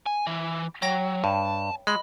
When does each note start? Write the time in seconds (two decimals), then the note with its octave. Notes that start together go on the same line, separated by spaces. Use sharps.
0.06 G#5
0.27 E3
0.82 F#3 C#5 G5 A#6
1.24 G2 A5
1.87 G#3 D#5 B5